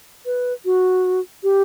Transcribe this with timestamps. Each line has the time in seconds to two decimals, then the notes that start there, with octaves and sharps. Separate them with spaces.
0.26 B4
0.65 F#4
1.43 G4